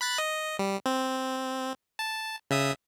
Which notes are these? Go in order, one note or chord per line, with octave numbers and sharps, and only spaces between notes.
B5 F#6 A6
D#5
G3
C4
A5
C#3 E5 D#6